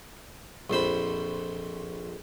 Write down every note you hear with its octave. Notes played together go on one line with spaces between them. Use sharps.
A#1 F2 C5 B5